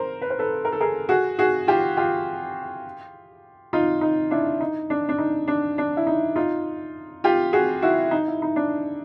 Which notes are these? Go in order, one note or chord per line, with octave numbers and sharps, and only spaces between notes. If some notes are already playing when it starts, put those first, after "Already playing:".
Already playing: A#4 C5
B4
C5
A4 B4
A#4
A4
G#4 A#4
F#4 G#4
F#4 G#4
F4 G4
F4 G4
D#4 F4
D#4
D4 E4
D#4
D4
D4
D#4
D4
D4
E4
D#4
D#4 F4
F4 G4
F#4 G#4
E4 F#4
D#4
E4
D#4
D4